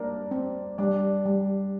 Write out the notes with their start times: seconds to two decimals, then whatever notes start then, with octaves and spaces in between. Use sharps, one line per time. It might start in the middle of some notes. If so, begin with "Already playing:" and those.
Already playing: G3 A#3 D4 A#4 D5
0.31 C4
0.78 G3 D4 D5
1.26 G3